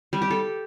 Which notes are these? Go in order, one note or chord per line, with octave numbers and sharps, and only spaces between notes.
G3
G4
A4